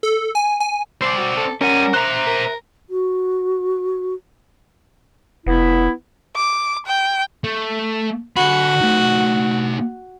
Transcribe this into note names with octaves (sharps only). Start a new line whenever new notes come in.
A4
G#5
G#5
C4 D5 C6
F#4
A4
G3 C#4 A#4 F#5 G#5
C5 E5 A#5 F#6
A#4
F#4
F1 B3 E4
D6
G5
A3
D3 F#4 B5
A3 D#4